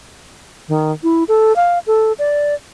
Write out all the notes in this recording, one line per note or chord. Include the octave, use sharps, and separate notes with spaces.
D#3
E4
A4
F5
A4
D5